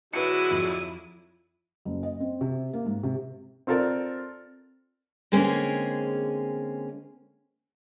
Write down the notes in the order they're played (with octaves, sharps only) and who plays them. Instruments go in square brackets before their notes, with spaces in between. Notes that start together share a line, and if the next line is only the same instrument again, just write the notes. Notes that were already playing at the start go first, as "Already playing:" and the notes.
[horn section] D3 F#3 G#3 [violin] E4 D#7 [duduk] F#4 [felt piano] B4 C#7
[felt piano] F2
F#1
D#5
C4
C3
A#3
G#2
C3
[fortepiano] C4 F4 A4 A#4 D5
[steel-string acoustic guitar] D3 G#3 A#3 C4 C#4 G#4